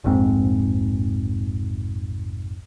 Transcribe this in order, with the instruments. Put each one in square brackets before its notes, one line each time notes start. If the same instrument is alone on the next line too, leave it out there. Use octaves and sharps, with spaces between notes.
[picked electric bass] F1 A#1 G#2 C4